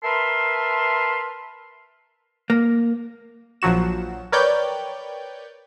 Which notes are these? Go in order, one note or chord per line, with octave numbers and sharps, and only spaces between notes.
A#4 B4 E5 A5 C6
A#3
A#1 F3 F#3 F#4 E7
A#4 B4 C#5 D5 G5 G6